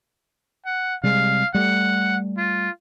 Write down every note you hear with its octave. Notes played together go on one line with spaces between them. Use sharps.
F#5
C3 G3 G#3 F5
G3 A3 F#5
F4